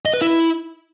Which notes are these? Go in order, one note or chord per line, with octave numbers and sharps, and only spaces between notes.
D#5
B4
E4